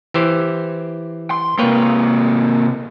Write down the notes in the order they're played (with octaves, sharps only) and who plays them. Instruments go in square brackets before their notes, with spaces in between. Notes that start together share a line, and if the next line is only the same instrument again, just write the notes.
[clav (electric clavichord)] E3 G4 C5
[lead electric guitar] C6
[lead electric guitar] C3 A#3 [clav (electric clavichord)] B4 C#5 G5